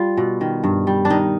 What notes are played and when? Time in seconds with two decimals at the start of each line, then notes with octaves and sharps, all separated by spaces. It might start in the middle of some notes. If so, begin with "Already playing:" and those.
Already playing: G3 F4
0.17 B2
0.41 D#3
0.64 G2
0.87 G3
1.05 D4
1.10 D#3 D#4